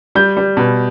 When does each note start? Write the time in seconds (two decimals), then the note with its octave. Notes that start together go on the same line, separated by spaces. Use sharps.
0.15 G3 G6
0.37 G3
0.57 B2